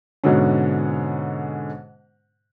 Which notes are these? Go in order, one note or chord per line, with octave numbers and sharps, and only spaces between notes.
G#2 B2 D3 C#4